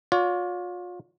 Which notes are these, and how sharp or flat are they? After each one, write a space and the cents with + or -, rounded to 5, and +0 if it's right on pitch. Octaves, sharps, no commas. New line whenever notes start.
F4 +35 C#5 +45